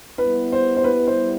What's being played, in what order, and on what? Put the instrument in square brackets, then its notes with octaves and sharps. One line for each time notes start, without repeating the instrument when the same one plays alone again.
[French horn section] G3 B3 E4 [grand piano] B4
[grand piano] C5
C5
B4
C5